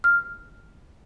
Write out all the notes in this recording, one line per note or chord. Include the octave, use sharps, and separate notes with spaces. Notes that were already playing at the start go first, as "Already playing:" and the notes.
F6